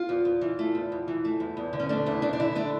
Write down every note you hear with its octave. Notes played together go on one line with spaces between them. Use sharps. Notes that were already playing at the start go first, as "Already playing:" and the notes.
Already playing: F4
E2
E2
E3
A3
E2
E2
E3
A3
E2
E2
D3
C#4
A3 D4
E2 E4
E2 D4
D4
D3 E4
A3 D4